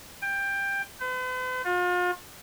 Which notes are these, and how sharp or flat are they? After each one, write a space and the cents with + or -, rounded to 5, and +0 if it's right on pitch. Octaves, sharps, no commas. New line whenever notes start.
G5 +15
B4 +45
F4 +40